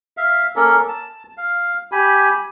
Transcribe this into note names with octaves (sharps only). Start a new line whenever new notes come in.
E5 F5
A#3 C#4 A4 A#4
A5
F5
G4 G#5 B5